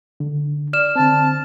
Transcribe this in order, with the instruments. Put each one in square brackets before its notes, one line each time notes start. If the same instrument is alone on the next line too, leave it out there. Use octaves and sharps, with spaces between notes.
[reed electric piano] D3
[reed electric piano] D5 [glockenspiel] F6 E7
[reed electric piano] D3 C4 [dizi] A5